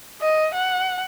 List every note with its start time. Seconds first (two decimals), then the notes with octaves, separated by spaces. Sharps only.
0.21 D#5
0.54 F#5